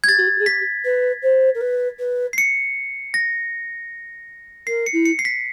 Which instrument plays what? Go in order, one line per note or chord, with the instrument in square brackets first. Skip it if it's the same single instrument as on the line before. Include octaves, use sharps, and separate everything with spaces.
[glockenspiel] G#6
[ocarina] G4 [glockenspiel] A6
[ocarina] F#4
G4
G#4
[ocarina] G4 [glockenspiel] B6
[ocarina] B4
C5
A#4
B4
B4
[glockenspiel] C7
C#7
A#6
[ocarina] A#4 [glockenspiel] C7
[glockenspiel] C#7
[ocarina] E4
[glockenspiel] C#7
C7
B6